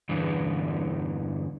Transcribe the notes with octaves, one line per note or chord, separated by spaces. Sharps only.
E2 G2 D3 E3